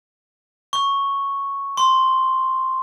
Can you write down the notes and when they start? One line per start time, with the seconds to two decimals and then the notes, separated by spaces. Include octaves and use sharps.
0.73 C#6
1.77 C6